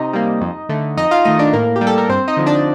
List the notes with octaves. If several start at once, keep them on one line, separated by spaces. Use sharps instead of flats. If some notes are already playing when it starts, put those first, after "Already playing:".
Already playing: C3 D#4 D#5
G3 A#3
F2
D3 A3
F2 D#4 D#5
F4 F5
D#3 A3 D#4 D#5
D4 D5
A2 A#3 A#4
G4
G3 A#3
A4
A#4
G2 C4 C5
D#4 D#5
D3 F3
D4 D5